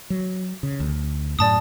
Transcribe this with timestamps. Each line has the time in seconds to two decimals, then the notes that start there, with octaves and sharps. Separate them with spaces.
0.10 F#3
0.63 C#3
0.80 D2
1.39 F#2 A2 D5 A5 D#6